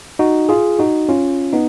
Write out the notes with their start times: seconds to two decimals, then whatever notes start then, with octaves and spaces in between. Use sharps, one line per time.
0.19 D#4 F#4
0.49 F4 G#4
0.79 D#4 F#4
1.09 C#4 F4
1.53 B3 D#4